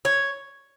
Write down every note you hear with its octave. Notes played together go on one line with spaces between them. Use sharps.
C#5